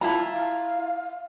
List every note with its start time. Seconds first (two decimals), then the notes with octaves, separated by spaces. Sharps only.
0.01 E4 F4 A5 A#5
0.33 F5